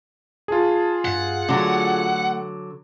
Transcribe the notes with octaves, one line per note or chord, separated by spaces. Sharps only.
F4 G#4 A5
G2 F#5
D3 F#3 A3